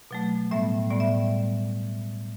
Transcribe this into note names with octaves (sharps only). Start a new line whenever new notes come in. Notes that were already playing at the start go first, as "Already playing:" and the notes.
B2 F#3 A3
A2 G3 B3 E5
A2 G3 B3 D5
E5